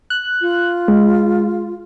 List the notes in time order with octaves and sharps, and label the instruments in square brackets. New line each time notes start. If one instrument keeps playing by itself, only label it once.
[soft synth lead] F#6
[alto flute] F4
[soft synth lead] G#3